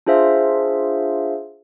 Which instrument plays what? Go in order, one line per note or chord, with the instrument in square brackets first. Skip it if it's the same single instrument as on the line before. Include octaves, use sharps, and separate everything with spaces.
[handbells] D4 F4 G#4 C5 E5 F5